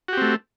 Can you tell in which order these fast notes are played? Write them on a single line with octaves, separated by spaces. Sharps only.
F#4 G4 C4 A3